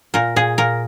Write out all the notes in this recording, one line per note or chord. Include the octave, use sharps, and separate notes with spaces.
A#2 A#4
A#2 G#4
A#2 A#4